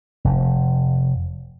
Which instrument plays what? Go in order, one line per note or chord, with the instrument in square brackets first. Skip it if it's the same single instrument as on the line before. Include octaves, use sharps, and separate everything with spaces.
[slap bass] F1